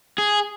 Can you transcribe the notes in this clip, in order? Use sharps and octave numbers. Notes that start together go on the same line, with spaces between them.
G#4